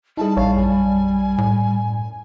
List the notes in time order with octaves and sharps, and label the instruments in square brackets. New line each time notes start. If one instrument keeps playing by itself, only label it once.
[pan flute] G3 [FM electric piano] D#4 E4 G#4 [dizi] A5
[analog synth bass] A#1 [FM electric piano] C#5 A5 [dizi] F5
[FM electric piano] F#2 [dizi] G#5
[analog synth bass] A2